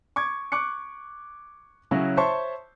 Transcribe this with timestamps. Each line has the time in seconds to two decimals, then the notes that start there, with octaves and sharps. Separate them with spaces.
0.16 C#6 D6 G#6
0.52 C#6 D6 F#6 C#7
1.91 C#3 F#3 C#4 E4 F#4
2.17 C5 C#5 E5 A5 C6 C#6